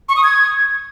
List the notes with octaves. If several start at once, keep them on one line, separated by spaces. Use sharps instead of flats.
C#6
D#6
G#6